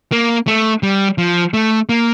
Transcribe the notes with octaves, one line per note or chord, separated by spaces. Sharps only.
A#3
A3
G3
F3
A3
A#3